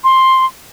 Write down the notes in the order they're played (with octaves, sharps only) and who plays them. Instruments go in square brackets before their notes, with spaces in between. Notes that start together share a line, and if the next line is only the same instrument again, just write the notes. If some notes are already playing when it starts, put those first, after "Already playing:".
[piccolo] C6